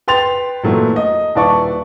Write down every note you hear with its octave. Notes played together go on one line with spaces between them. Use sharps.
B4 G5 C6 A6 F7
A#2 E3 F#3 A3
D#5
D#1 E4 B4 D5 A5 C#6